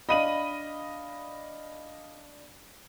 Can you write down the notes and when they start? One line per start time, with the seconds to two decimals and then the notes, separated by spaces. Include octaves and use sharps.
0.09 D4 D#5 F5 B5 D#7 F#7